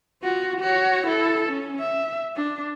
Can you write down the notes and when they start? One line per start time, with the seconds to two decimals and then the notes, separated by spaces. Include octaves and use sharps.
0.23 F4 F#4
0.60 F#4 C#5
1.07 E4 A4
1.49 C#4
1.79 E5
2.36 D4